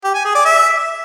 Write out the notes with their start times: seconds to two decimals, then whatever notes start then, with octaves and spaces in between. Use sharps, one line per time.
0.04 G4
0.14 G#5
0.25 G#4
0.35 D5
0.45 E5